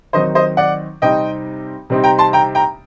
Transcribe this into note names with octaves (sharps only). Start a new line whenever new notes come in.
D#3 F#3 C4 D#4 C5 D#5
C5 D#5
D5 F#5
C3 G3 C4 D#4 D#5 G5
C3 G3 C4 D#4
G5 A#5
A5 C6
G5 A#5
G5 A#5